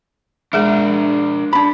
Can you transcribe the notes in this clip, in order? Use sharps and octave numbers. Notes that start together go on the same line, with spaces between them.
G#3 D4 G#4 A#4 E5
D4 B5